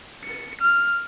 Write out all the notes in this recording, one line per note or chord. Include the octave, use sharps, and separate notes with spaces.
C#7
F6